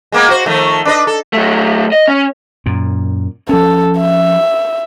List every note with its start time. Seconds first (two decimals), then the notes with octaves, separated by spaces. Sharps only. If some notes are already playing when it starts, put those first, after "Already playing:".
0.12 G#3 A#3 B3
0.28 F#4 C5
0.46 D#3 F3 A3
0.85 D4 B4 D#5
1.07 A4
1.33 F#3 A3
1.92 D#5
2.08 C#4
2.66 F#2 A#2
3.49 F3 C#4 A4
3.99 E5